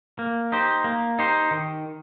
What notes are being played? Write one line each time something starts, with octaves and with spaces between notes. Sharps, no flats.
A#3
D#4 G4 C5
A#3
D#4 G4 C5
D#3